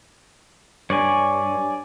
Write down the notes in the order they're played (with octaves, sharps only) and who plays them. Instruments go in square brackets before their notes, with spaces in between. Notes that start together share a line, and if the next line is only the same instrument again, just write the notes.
[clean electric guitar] G2 [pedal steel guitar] C#5 D5 G#5